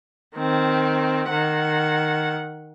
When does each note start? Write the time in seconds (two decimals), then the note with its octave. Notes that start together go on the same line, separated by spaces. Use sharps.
0.36 D#3 C4
1.30 D#3 F#5